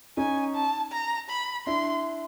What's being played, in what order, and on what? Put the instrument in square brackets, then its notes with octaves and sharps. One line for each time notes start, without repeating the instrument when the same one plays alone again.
[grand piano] C#4 D#4 [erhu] G#5
[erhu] A5
A#5
B5
[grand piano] D4 E4 [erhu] C6